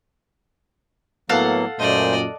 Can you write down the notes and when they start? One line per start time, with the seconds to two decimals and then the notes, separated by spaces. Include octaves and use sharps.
1.29 A2 F#3 A#3 B3 A4 F5 F#5
1.79 F#2 A#2 A3 C5 D5 D#5